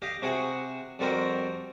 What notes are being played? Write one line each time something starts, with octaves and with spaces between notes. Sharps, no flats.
G4 D#5 F5
C3 F#4 G#4 F#5
F2 G3 C4 F#4 A#4 G5